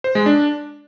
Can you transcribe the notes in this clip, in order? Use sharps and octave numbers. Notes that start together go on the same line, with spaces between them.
C5
G#3
D4